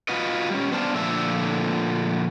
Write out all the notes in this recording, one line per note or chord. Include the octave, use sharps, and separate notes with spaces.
F4 F#4 B4 D#5
G3 C#4
B3 D4 C5 D5 F5 A5
A#2 D3 F3 A3 E5